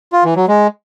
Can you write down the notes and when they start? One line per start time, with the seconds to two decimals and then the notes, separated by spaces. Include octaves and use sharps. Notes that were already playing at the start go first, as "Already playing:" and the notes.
0.13 F4
0.24 E3
0.36 F#3
0.48 G#3